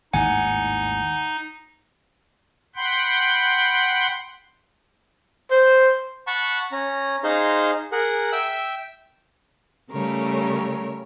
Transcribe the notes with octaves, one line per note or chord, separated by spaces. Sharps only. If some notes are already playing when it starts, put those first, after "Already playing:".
G#1 D#2 A2 D#4 F#5 G#5
F#5 G5 B5 C6 G6
C5
F#5 A5 B5 C#6
C#4 A#5
D#4 G#4 C5 F5 A#5 C6
G#4 A#4 F#5
E5 G5 E6
C#3 G3 A3 A#4 C#5